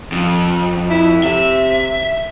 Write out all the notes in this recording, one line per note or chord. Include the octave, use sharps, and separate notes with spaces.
F2
E4
C3 E5